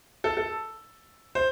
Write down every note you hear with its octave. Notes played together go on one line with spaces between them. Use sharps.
A4
A4
C5